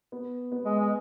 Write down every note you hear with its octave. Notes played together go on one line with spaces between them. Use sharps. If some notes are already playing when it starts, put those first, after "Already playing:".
B3
B3
G#3
G#3